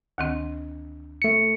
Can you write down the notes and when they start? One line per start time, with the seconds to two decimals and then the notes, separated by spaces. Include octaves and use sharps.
0.18 D2 D#3 C4
1.22 A3 C#7